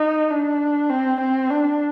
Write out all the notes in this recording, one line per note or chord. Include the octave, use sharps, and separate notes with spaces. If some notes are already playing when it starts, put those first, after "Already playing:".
Already playing: D#4
D4
C4
C4
D4